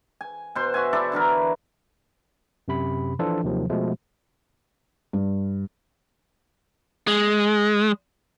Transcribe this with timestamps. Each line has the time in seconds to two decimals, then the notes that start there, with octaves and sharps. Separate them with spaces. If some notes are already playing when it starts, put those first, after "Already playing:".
0.21 G#5
0.55 B2 C5 C6
0.74 F#4 E5 G#5
0.93 E4 A4 D5 E5
1.12 D3 E3 E4 A#4
2.68 F#2 C3 B5
3.19 E3 F3 D4 F4 A4
3.44 D#2 C3 D#3 F3 F#3
3.70 B2 F3 G#3 A3
5.13 G2
7.07 G#3